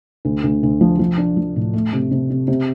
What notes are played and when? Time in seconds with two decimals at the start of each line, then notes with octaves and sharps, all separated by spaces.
0.25 D2
0.44 D2
0.63 D2
0.81 F3
0.99 F3
1.18 D4
1.37 F3
1.56 A2
1.73 A3
1.93 C3
2.11 C3
2.30 C3
2.48 C3